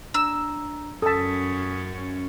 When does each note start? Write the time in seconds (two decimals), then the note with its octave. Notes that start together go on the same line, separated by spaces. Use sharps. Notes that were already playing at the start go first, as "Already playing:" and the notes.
0.14 D4 A#5 E6
1.02 F#2 C#4 A4 A5 D#6 B6